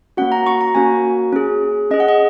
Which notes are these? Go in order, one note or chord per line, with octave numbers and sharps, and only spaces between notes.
A#3 C#4 F#4 F#5
A#5
C#6
A#5
A#3 C#4 F#4 G#5
C#4 G#4
C#4 G#4 D#5
F#5
D#5